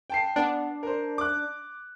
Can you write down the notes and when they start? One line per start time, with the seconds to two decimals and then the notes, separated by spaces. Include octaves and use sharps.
0.10 G5 A5 C7
0.36 B3 D4
0.83 A#4 C5
1.18 D6 F#6